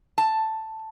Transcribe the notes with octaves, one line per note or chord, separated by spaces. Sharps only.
A5